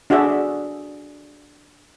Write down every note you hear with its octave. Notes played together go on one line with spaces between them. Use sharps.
D4 F#4 G#4 D5 E5